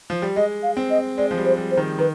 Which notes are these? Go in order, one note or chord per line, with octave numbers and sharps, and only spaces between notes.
F3
G3
G#3 D#5
F5
C4
D#5
G#3 D5
F3
G3
C5
G3
C5
D#3
D#3 B4